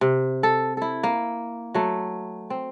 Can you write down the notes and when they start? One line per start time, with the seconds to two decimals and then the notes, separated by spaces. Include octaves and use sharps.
0.01 C3
0.43 A4
0.77 E4 A4
1.03 A#3
1.74 F#3 A3
2.50 C4